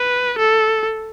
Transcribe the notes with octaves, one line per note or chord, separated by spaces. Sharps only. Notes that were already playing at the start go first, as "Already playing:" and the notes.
Already playing: B4
A4